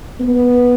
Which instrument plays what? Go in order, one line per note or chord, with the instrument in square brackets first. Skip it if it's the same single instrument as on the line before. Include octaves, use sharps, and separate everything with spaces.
[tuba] B3